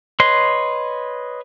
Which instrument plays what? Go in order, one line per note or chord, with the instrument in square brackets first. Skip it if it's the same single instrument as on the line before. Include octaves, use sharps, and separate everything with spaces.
[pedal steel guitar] B4 C#5 D#5 C6